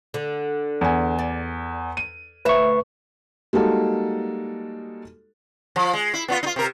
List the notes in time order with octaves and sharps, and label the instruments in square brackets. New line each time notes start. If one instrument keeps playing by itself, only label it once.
[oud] D3
[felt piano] E2 G#5
[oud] D5
[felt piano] D#7
[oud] D2 C#5 E5 [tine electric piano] B4 C#6
[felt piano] G3 G#3 A#3 D#4 F#4 A4
[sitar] F3
G#3
E4
B3 D4 F4
D#4 F4
C3 A#4